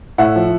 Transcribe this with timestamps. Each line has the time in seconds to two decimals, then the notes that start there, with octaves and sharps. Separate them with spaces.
0.18 A2 E5 F#5
0.36 F3